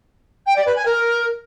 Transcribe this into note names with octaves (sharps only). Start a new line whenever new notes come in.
G5
D5
B4
G#5
A#4